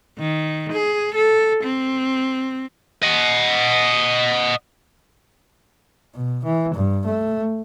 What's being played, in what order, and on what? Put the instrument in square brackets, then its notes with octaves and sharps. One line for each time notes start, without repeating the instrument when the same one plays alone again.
[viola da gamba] D#3
G#4
A4
C4
[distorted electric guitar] D#5 F#5
[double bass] B2
E3
G2
A3